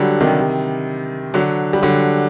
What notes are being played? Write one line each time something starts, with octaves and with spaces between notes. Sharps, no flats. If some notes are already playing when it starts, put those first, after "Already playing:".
Already playing: D3 F#3 G3
C3 D#3
D3 F#3
G3
D3 F#3